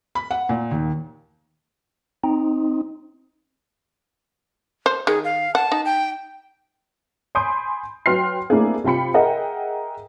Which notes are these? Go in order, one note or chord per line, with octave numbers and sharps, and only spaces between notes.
B5
F#5
A#2
D#2
C4 D#4
C5
D#3 G#4
F5
F#5 A5
D#4
G5
G#5 B5 C6 D#6 G6 D7
F#3 B4 G5 C6 F6 C7
A3 A#3 C4 D4 E4 G#4
C3 F4 G5 B5 C#7
G#4 A#4 D#5 E5 F#5 G5